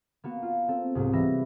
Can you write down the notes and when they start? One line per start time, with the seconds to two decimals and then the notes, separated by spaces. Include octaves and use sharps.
0.24 A#3 B3 F#4
0.43 F4
0.68 C4 A4
0.95 C2 G#2 F#3
1.13 E3 G3 B4 E5 A#6